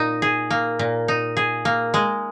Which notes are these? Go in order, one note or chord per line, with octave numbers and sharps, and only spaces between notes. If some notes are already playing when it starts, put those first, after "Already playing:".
Already playing: A#2 D#4
G#4
A#3
A#2
D#4
G#4
A#3
G#3